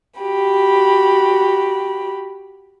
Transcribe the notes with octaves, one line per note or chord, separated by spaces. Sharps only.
F#4 G4 B5